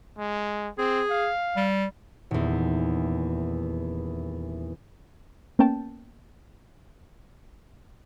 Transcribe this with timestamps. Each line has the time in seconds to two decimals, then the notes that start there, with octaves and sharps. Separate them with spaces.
0.18 G#3
0.78 C4 G#4
1.10 F5
1.57 G3
2.31 D#1 E2
5.59 A#3 B3 C#4 G5 A5